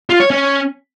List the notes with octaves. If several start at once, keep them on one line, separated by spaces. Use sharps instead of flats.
F4
C#5
C#4